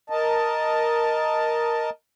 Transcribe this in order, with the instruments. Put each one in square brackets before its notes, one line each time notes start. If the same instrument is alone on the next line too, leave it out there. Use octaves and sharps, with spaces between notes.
[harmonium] A#4 D#5 A5